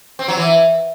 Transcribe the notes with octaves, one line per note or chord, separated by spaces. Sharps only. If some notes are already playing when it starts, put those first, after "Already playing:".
C4
F#3
E3